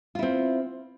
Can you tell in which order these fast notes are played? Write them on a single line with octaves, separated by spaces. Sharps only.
F4 E4 C4